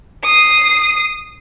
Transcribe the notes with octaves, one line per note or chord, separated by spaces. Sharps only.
D#6 C7